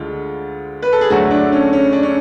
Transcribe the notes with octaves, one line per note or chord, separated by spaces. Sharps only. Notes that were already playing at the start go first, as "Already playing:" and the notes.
Already playing: D2 D3 G#3 F4
B4
A4
G#4
D2 D3 F#3 A3 F#4
D4
C#4
C#4
D4
C#4